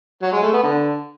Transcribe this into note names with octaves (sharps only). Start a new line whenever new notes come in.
F#3
G#3
A3
B3
D3